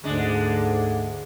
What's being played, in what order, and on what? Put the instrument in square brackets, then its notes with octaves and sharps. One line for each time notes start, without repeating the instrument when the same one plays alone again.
[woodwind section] D2 G#2 D3 [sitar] G#3 D4